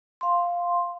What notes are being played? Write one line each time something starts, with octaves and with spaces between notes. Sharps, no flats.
F5 C6